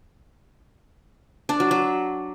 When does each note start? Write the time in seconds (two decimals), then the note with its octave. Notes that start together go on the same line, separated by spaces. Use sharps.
1.49 D4
1.60 F#3
1.71 F#3